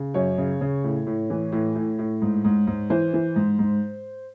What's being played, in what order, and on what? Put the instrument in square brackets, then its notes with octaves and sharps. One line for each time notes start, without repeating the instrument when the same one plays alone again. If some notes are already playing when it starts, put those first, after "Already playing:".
Already playing: [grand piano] C#3
F#2 C#5
C#3
C#3
A2
A2
E3
A2
A2
A2
G#2
G#2
G#2
E3 C5
E3
G#2
G#2